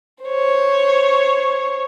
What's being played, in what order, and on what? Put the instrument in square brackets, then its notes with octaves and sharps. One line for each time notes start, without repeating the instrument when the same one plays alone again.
[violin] C5 C#5